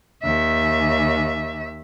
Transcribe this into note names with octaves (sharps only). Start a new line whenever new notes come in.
D#2 E5